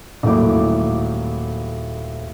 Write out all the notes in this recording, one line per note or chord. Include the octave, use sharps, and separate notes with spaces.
D#1 F#3 A3 A#3 E4 D6